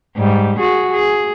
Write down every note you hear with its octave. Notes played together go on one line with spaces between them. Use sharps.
G#2 G3
F#4 G#4
G#4